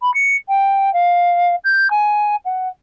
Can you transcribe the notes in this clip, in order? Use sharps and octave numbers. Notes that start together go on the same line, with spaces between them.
B5
C#7
G5
F5
G6
G#5
F#5